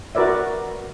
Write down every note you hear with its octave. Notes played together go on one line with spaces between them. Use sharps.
F#4 A#4 B4 D5 E5